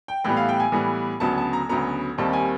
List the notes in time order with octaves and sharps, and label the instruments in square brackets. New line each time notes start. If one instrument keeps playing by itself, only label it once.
[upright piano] G5
A2 E3 G3 B3 G5
F5
G5
G#5
A2 E3 G3 B3
D2 C#3 F#3 B3 A5
A5
A#5
D2 C#3 F#3 B3 A#5
D#2 D#3 G3 C4 A5
G#5